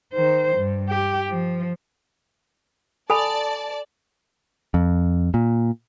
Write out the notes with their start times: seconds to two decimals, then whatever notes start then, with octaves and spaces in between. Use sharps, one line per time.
0.13 D#3 C5
0.57 G2
0.89 G4
1.28 F3
3.10 A4 D5 G#5 A5 B5
4.74 F2
5.34 A#2